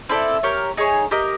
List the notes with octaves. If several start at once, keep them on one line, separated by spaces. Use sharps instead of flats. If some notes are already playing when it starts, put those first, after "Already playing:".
C4 E4 A4 D5
G4 A#4 C#5
D#4 G#4 C#5
G4 A#4 D#5